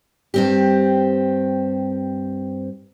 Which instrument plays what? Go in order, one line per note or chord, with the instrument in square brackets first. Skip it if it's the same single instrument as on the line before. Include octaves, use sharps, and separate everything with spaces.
[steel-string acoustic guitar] G2 C4 G4